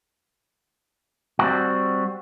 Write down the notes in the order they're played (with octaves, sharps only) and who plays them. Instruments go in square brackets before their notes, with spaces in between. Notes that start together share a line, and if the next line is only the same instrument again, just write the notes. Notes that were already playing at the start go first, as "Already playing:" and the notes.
[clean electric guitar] G3 C4 F#4